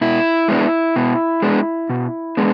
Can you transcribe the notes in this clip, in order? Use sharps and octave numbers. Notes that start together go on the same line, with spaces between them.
B2 E4
G#3 B3 D4
B2
G#3 B3 D4
B2
G#3 B3 D4